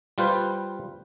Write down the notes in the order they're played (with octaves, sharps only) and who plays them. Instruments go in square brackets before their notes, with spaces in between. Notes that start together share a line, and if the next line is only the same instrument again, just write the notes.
[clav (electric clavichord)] G3 F4 B4 C5